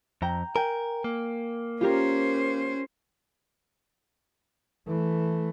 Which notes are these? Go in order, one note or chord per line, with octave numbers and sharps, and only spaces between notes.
F2 G5 A#5
A#4 G5 G#5
A#3
C#4 F4 G4 A#4 C5
E3 A3